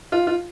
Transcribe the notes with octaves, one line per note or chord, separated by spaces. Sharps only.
F4
F4